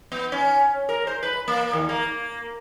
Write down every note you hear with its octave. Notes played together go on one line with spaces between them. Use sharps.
B3
C#4
A#4
C5
B4
A#3
D#2
A#3